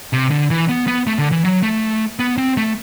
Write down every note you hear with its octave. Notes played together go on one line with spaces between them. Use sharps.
C3
D3
E3
B3
B3
A3
D3
E3
F#3
A3
B3
C4
A3